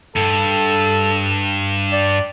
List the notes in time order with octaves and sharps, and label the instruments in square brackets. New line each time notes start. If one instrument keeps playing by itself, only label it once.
[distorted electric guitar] G2 [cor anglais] A4
[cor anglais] D5